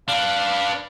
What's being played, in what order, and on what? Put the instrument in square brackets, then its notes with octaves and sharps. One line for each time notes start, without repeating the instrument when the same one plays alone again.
[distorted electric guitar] D4 B4 [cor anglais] F5